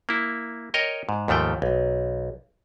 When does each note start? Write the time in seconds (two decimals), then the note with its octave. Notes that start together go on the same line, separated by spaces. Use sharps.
0.09 A#3 E4
0.74 A#4 C#5 D#5 G5
1.09 G#2
1.28 D#2 G#2 F3 A3 G5
1.62 B1